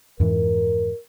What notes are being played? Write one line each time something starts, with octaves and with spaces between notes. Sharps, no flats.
F2 G#2 E3 A#4